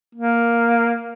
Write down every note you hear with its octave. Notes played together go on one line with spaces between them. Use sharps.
A#3